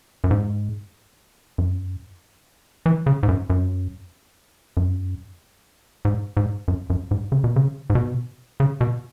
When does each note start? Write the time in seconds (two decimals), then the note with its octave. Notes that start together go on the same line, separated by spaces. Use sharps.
0.24 F#2
0.31 G#2
1.58 F#2
2.86 E3
3.06 C#3
3.23 G#2
3.28 F#2
3.50 F#2
4.77 F#2
6.05 G#2
6.37 G#2
6.68 F#2
6.90 F#2
7.11 G#2
7.32 C#3
7.44 B2
7.56 C#3
7.90 G#2
7.95 B2
8.60 C#3
8.81 B2